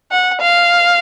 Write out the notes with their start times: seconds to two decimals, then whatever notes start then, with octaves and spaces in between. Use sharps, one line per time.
0.12 F#5
0.41 F5